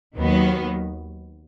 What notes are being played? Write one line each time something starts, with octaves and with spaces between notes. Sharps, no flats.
D#2 D#3 F#3 B3